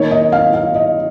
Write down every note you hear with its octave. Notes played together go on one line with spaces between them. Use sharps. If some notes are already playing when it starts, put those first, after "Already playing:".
Already playing: D#3 A#3 D#4 C#5
D#5
F5
F5
D#5